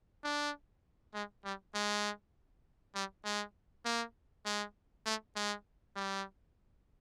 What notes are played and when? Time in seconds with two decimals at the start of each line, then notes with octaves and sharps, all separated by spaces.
0.24 D4
1.14 G#3
1.45 G3
1.74 G#3
2.95 G3
3.25 G#3
3.85 A#3
4.46 G#3
5.06 A3
5.36 G#3
5.96 G3